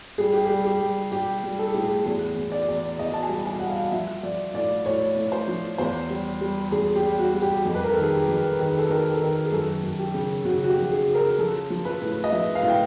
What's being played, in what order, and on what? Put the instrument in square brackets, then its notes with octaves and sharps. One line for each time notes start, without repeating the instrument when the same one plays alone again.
[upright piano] G3 G#4
G4
G3 G#4
G4
G3
G3 G4
G3
A4
G#4
A2 G4
G#4
E2 G#4
E2
D5
E2
E2 D#5
A5
G#5
G3
G#5
G3 F#5
F5
F3 E5
F3 D5
A2 D5
A2 C#5
A2
C5
F3
E2 C5
G3
G3
E2 G#4
G4
G3
F#4
G3
G4
F2 G4
B4
A#4
D#3 A4
G#4
G4
F2
D#3 G#4
A4
D#3 A#4
A4
D#3 A#4
G#4
F#2 A4
F#2
G4
C#3
C#3 F#4
F#4
G4
F3
G#4
C#3
A#4
F3 A4
F3
B4
A2
D#5
F3 E5
F5
A2
G5